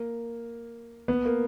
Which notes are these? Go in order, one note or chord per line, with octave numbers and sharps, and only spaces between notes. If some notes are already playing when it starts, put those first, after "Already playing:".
Already playing: A#3
B3
A#3